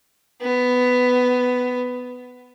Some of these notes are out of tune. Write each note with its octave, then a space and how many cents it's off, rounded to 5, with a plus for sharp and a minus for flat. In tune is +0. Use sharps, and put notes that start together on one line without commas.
B3 +10